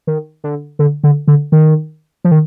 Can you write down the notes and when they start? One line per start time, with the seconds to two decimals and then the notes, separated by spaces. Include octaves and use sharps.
0.07 D#3
0.44 D3
0.79 D3
1.04 D3
1.27 D3
1.52 D#3
2.24 F3
2.31 D#3